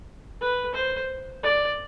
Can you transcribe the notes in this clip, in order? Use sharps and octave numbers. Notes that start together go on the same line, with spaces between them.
B4
C5
D5